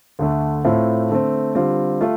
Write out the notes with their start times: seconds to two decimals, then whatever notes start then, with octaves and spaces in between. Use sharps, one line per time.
0.19 D2 D3 A3
0.65 A2 A3 C4 F4
1.10 D3 A3 C4
1.55 D3 G3 C4 F4
2.01 A3 F4